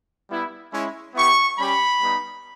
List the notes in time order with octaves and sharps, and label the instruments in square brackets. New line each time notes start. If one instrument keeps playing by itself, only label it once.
[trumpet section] G3 B3 E4
G#3 C#4 E4
B3 E4 G4 C#6
G3 C#4 G4 B5
G3 B3 D#4